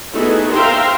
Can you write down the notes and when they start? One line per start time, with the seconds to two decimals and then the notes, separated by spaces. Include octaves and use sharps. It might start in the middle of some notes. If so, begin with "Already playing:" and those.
0.13 A3 B3 D#4 E4 F#4 G#4
0.52 C5 E5 F5 G5 A#5 C6